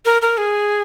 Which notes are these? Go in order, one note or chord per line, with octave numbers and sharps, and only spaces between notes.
A#4
A#4
G#4